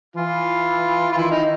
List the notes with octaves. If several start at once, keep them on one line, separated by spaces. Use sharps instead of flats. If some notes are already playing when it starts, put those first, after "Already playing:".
E3 F4
F4
D#3 E4
D#4